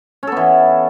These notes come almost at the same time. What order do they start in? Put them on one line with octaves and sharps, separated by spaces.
C#4 A4 B3 E3